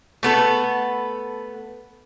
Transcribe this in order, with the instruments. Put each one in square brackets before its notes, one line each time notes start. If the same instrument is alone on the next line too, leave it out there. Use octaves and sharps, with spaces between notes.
[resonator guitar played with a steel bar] A3 B3 A4